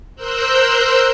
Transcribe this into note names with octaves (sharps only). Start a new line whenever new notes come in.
A#4 C5 E6 F#6 G6